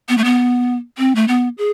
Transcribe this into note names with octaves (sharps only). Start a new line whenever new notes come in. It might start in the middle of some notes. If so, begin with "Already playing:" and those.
B3
A3
B3
C4
A3
B3
G#4